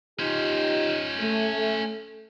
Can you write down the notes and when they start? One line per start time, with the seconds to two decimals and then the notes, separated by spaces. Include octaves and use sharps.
0.19 C#4 D#4 F4 G4 C5
1.19 A3